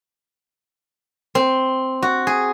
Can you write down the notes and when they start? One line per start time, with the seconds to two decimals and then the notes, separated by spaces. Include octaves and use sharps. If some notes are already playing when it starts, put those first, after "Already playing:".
1.35 C4
2.02 F#4
2.27 G#4